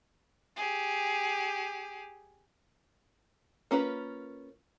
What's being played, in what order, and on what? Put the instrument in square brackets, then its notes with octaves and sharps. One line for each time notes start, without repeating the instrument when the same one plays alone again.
[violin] G4 G#4
[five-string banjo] A#3 C#4 F4 B4